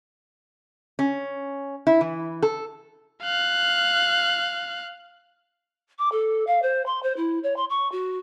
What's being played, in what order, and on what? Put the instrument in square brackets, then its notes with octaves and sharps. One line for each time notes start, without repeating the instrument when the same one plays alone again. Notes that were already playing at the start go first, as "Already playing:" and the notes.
[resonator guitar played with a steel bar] C#4
E4
E3
A4
[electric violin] F5 F#6
[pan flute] D6
A4
F5
C5
C6
C5
E4
C#5
C6
C#6
F#4